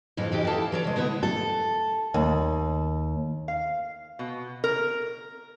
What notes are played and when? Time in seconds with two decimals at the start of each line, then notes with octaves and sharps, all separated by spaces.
0.17 F2 G#2 E3 F4
0.32 F2 E3 D#4 G4
0.47 E4 G4 A4 F5 A5
0.72 E3 C#5 D5
0.84 C3 G#3
0.96 D3 B3 E4 E5
1.23 A4
2.14 D#2
3.48 F5
4.19 B2
4.64 A#4